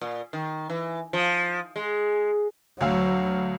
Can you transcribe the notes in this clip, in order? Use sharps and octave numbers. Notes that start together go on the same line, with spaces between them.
A#2
D#3
E3
F3
G#3
D2 F#3 F5 E6